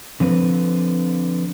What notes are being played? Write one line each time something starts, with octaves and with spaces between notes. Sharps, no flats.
D3 F3 C4 B4